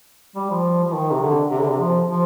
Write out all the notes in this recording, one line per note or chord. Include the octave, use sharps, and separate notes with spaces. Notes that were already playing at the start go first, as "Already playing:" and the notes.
G3
F3
F3
D#3
C3
D3
C3
D3
C3
F3
F3